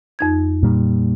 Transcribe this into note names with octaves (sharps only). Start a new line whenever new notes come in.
F2 D#4 G#6
A#2 G3